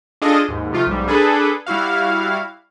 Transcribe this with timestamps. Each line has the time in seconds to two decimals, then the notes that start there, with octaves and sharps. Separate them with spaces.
0.22 D4 F4 G#4 A4 D#5
0.48 D#2 G#2
0.72 C3 F3 A3 F4
0.87 B1 G#2 G3
1.07 D4 G#4 A4 B4
1.66 G3 E4 F#4 F5